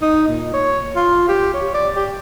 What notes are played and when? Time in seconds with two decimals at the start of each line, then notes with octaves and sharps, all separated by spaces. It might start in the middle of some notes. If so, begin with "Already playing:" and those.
0.02 D#4
0.28 A#2
0.54 C#5
0.96 F4
1.28 G4
1.54 C#5
1.74 D5
1.96 G4